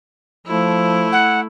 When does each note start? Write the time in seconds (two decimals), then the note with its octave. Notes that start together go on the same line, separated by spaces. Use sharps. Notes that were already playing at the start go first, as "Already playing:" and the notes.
0.47 F3 A3 E4
1.12 F#5